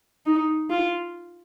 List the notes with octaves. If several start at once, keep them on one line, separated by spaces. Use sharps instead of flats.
D#4
F4